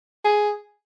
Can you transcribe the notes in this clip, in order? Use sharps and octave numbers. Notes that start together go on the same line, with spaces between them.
G#4